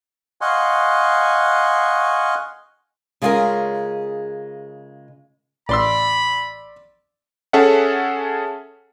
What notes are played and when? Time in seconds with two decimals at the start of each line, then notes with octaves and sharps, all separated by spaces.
0.41 D#5 F5 F#5 G#5 C6 C#6
3.22 C#3 G#3 F4 F#4 G#4 A#4
5.69 A1 D5 B5 C6 E6
7.53 C#4 G#4 A4 C#5 E5 F#5